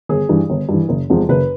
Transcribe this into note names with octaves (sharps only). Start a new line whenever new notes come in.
G1 G#4
G2 E3
G1
G2
E3
F#1
E2 C3 F3 G#3
F#1 B4